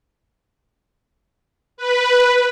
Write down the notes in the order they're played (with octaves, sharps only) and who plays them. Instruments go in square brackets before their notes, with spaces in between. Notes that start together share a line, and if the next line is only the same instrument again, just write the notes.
[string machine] B4